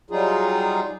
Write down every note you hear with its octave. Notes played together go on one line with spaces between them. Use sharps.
F#3 G3 D#4 F4 G#4